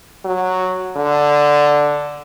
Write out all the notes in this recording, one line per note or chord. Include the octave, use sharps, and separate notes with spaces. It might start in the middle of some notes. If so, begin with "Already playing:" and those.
F#3
D3